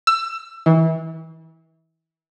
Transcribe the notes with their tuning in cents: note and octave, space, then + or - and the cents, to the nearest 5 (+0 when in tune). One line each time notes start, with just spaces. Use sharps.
E6 +25
E3 -30